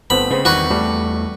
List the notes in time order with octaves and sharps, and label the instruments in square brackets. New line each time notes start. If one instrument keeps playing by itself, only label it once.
[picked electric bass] G1 [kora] A3 B3 C4 [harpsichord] B5
[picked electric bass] C#3 [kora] G#3 C4
[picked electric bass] E2 D#3 [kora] G3 [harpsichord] F#4 B4
[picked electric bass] E2 A3 [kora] G3